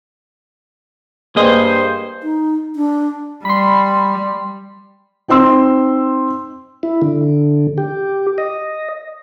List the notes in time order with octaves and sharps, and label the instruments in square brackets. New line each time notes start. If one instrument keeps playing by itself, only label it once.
[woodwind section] G2 C5 [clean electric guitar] A#3 G#4 D#5
[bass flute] D#4
D4
[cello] G3 [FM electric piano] B5 C6
[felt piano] C4 D#4 C5 C6 E6
[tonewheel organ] E4
D3
G4
D#5